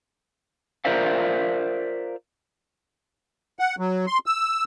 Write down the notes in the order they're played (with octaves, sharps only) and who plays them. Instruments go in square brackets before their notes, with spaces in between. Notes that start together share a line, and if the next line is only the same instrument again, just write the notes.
[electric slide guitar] F4 A#4 C5 D5 E5 F5
[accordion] F#5
F#3
C6
E6